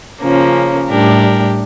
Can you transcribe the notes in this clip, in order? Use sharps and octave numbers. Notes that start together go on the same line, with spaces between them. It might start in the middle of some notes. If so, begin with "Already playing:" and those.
C#3 F3 A#3 C#4
A2 G3 D4 G4 A#4